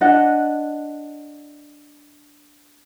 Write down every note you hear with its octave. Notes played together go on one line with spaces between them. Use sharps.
D4 D#5 F#5